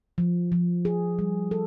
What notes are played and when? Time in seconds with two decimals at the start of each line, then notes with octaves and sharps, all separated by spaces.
0.18 F3
0.52 F3
0.85 G#4
1.19 G3
1.51 A4